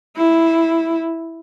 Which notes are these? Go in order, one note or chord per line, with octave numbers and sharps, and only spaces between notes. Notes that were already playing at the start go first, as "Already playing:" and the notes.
E4